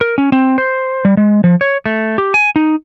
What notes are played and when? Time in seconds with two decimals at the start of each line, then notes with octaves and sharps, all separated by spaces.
0.01 A#4
0.18 C#4
0.32 C4
0.58 C5
1.05 G3
1.17 G#3
1.44 F3
1.61 C#5
1.86 A3
2.18 G4
2.34 G#5
2.56 D#4